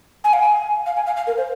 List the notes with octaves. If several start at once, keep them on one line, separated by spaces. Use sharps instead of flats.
G#5
F5
G#5
F5
G#5
F5
F5
A#4
C5